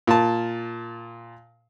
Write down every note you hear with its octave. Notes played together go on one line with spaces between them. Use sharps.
A#2 A5